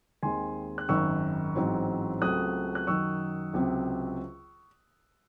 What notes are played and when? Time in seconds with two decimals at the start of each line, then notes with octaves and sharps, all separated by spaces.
0.23 D#2 D#3 G#3 C4 G#5 C6
0.78 F#6
0.89 G#1 F#2 D#3 C#6 E6
1.55 A1 G#2 F#3 C4
2.21 C#2 C#3 F#3 A3 C4 D#6 F#6
2.75 F#6
2.87 F#2 D#3 F#3 C#6 E6
3.54 C#2 C3 F#3 C4